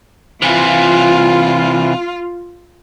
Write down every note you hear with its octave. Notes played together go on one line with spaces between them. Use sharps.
C3 E3 F4